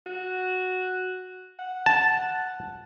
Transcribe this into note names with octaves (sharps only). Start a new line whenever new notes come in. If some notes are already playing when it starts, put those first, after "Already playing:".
F#4
F#5
A5